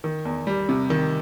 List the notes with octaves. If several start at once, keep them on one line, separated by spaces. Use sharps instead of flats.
D#3
E2
G3
C3
D#3